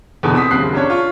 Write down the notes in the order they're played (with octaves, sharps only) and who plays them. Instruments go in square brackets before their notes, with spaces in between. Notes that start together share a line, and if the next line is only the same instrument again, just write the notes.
[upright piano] E2 B2 D3
C4 D#6 B6
F#1 D#2 C#3 C4 F#6 C7
C#4 D4 C#5
F4 C#6